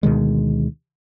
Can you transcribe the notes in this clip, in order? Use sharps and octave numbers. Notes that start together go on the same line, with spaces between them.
D2 B2 D#3 G#3